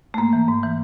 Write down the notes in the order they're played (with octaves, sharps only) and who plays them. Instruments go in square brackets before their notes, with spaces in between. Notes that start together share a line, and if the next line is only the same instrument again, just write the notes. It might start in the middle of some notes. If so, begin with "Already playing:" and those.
[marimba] A3
G#2 A#3
E3
G#2
E3